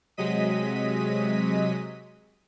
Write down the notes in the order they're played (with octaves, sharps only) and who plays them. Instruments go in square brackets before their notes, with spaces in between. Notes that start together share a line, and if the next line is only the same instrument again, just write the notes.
[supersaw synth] C3 F#3 G#3 D#5 B6 D#7